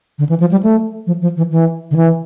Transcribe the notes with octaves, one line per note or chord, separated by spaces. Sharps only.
D3
E3
F3
G3
A3
F3
F3
E3
E3
D3
E3